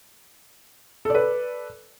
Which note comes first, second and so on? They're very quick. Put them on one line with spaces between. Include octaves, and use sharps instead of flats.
A4 D5 B4